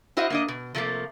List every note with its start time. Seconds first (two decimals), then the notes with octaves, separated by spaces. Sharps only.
0.17 E4 F#4 C5 D#5 F5
0.30 A#3 D4 D#5
0.48 B2
0.75 C3 F3 A3 A#3